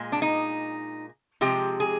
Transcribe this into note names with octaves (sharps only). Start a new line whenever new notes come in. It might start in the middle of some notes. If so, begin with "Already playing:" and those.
Already playing: A#2 G#3
D4
D#4
C3 F3 G#3 G4
G#4